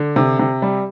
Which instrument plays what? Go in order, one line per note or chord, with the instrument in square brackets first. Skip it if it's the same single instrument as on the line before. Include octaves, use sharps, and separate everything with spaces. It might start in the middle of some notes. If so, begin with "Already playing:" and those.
Already playing: [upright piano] D3
C3
C3
G3